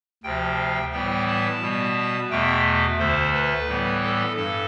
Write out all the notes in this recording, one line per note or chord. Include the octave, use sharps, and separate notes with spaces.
D2 C3 F3 G5
A2 E3 G3 B3 G5
A5
B2 G3 B3
E2 B2 A3 G5
D2 D3 A3 C5
B4
A2 E3 G3 B3
A4
G2 A4